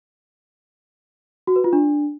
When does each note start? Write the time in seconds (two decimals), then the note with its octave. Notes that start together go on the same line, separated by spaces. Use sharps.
1.47 F#4
1.56 B4
1.64 F4
1.73 D4